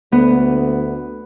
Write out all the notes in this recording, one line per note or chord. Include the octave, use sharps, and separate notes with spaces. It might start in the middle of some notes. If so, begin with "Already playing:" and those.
D2 B3